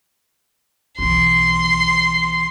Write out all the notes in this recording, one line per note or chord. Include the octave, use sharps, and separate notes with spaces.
B1 E3 C6